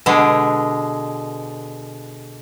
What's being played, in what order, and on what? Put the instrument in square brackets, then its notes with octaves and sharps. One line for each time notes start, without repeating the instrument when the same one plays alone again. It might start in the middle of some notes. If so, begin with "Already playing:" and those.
[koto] B2 D3 G#3